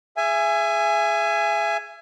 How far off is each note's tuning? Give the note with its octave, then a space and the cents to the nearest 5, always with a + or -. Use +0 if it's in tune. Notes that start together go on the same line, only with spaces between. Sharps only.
G#4 +0 E5 +30 G#5 +0